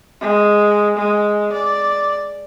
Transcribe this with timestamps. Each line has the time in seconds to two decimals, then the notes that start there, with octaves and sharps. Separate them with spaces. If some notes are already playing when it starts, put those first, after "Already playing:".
0.21 G#3
0.97 G#3
1.52 D5